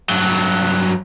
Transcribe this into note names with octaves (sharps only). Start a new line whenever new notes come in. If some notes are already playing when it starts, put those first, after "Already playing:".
G2 F#3